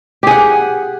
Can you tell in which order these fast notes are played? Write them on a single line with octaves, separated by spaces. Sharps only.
G4 G#4 F#5